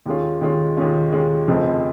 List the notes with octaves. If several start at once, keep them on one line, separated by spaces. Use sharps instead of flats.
D#2 D#3 G#3 C#4 F4
D#2 D#3 G#3 C#4 F4
D#2 D#3 G#3 C#4 F4
D#2 D#3 G#3 C#4 F4
F1 F2 C#3 F3 C4